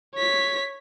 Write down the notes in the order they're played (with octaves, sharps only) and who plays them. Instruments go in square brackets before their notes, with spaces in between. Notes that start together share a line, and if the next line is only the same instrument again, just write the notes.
[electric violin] C#5 B6